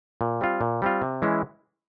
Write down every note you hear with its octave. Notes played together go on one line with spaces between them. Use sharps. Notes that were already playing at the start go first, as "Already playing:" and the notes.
A#2
G3 C4 F4
A#2
G3 C4 F4
C3
E3 G#3 C#4 E4